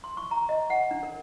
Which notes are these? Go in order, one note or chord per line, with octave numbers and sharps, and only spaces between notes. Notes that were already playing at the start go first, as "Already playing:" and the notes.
C6
C#6
A#5
D#5
F#5
D4
A#4